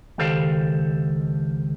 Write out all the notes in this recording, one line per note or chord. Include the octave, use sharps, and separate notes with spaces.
C#2 D#3 G4 A4 C5 F5